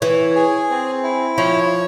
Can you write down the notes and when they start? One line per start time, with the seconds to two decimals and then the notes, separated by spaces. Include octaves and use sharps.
0.01 E3 C#5
0.35 G#4
0.70 C4
1.03 E4
1.38 F3 C#5